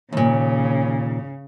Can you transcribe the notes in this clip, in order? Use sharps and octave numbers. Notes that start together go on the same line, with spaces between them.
D#2 A#2 C#3